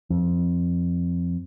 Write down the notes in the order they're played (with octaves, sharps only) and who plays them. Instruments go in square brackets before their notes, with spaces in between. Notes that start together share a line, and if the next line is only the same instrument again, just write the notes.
[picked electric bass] F2